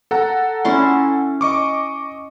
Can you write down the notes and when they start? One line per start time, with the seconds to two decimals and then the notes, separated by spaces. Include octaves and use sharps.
0.11 A4 F#5 A#5
0.64 C#4 E4 C6
1.41 D#5 C#6 D6